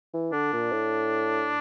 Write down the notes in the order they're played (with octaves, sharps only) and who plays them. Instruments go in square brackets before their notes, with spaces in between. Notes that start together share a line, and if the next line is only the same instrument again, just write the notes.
[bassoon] E3
[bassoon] D3 [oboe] D4
[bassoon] A#2
A2